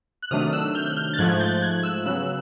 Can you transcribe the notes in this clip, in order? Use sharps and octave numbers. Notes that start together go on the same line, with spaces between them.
F#6
C3 D#3 F#3 A3 D4 D#6 F6
E6 F#6
F6 G6
F#6
F6 G6
A6
G#2 F3 A3 F#6 G#6
G#6
G6 A6
F#6 G#6
E6 F#6
C#3 F#3 B3 E6 F#6